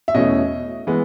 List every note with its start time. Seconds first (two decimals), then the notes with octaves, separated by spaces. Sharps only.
0.08 E5
0.14 E2 B2 A3 C#4 E4 D#5
0.87 E3 G#3 B3